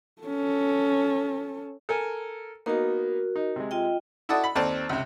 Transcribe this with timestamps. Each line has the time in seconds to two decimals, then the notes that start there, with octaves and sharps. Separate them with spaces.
0.22 C#4 A4
1.89 A4 A#4 G#5
2.66 A#3 B3 D#4 F#4 A#4
3.36 D#4
3.56 C3 G#3
3.71 F4 D#5 G5
4.29 E4 F#4 A4 D5 D#6
4.44 B5
4.55 D#2 C4 A4 C5 D5 A5
4.89 C#2 C3